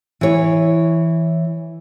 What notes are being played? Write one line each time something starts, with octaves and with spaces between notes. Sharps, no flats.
E3 C#5